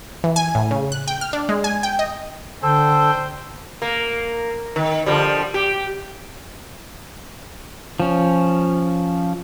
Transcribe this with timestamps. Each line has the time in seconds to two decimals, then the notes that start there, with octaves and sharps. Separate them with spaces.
0.24 E3
0.36 G#5
0.55 A2
0.71 C#3
0.92 F#6
1.08 G5
1.21 F6
1.33 D4
1.49 G#3
1.64 G#5
1.83 G5
1.99 D#5
2.63 D3 A4 C5 G5
3.82 A#3
4.76 D#3
5.06 D3 F3 G3
5.54 G4
8.00 F3 C#4